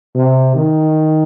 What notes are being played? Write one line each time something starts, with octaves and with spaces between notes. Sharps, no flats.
C3
D#3